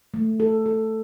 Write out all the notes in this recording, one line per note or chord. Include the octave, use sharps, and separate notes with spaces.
A3
A4
A4